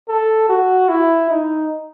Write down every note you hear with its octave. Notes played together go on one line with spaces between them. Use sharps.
A4
F#4
E4
D#4